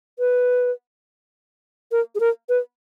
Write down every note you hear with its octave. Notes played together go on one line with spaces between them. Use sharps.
B4
A#4
G#4
A#4
B4